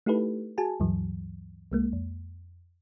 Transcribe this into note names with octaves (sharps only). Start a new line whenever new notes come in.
A3 D#4 E4 G4 A4 B4
F#4 G#4 G#5 A5
D2 G2 E3 F#3
C2 G#3 A#3
F2